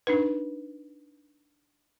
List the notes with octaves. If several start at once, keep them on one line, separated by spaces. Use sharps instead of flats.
D4 D#4 B4